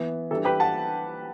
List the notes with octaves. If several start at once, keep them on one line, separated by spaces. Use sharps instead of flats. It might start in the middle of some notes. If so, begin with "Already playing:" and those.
Already playing: E3 B3 E4
E3 G3 D4 A4
G4 B4
F#5 A5